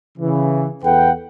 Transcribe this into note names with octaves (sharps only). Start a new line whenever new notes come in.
C#3 E3
E2 A4 B4 F#5 G5